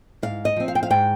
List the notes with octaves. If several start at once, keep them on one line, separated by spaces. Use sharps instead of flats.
G#2 F5
D#5
F3 C4
F5
G5
F5
G#2 G5